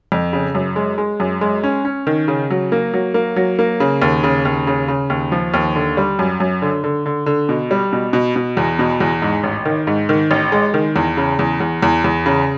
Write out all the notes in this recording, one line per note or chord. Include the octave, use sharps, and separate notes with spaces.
F2
C#3
F#2
G#3
G#3
F#2
G#3
C#4
C#4
D#3
C#3
F#3
A#3
F#3
A#3
F#3
A#3
C#3
D#2
C#3
D#2
C#3
C#3
D#2
F3
D#2
D3
G3
F#2
F#2
D3
D3
D3
D3
B2
G3
B2
B2
B2
E2
B2
E2
G#2
A1
D#3
G#2
D#3
A1
G#3
D#3
E2
C#3
E2
E2
E2
E2
C#3